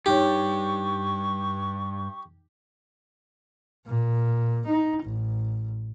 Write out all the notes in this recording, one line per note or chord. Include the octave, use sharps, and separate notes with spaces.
G2 D#4 G4 C#5 C#6
A#2
D#4
A1